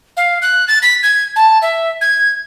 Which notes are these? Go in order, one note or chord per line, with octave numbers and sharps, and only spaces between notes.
F5
F#6
A6
B6
G#6
A5
E5
G#6